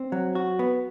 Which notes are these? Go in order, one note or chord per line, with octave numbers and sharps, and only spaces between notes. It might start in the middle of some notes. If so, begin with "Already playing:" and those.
Already playing: C4
F#3
F#4
B3